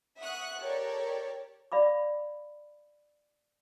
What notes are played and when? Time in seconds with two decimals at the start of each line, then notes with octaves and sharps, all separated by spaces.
0.19 E5 F#5 C#6 D#6 F#6
0.59 G4 A4 A#4 C#5 D5
1.72 D5 F5 B5 D6